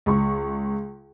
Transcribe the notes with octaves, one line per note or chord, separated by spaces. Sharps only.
C#2 C#6